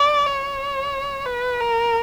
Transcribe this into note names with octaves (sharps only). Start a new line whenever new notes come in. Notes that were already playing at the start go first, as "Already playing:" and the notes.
Already playing: D5
C#5
B4
A#4